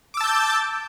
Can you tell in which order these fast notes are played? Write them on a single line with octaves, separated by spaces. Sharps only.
D6 E6 A5 G6 A6